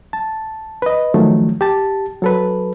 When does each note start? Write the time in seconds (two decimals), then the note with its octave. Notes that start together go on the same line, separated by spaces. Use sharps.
0.13 A5
0.82 B4 D#5
1.14 D#3 F3 F#3 A3
1.61 G4 A5
2.22 F#3 A4 B4